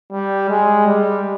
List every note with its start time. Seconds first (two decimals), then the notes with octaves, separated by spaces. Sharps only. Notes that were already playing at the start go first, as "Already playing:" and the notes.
0.12 G3
0.49 G#3
0.86 G3